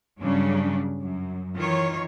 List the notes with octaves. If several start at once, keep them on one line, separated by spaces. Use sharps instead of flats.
G2 C#3 F#3 G3 C#4 D4
F#2
D#3 E3 F4 C#5